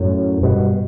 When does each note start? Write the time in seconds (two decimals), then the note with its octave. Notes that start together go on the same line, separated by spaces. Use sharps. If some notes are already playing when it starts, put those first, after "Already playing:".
Already playing: F#2 A2
0.42 G2 B2